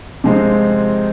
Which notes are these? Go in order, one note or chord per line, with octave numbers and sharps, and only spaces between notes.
C3 F3 G#3 C4 D#4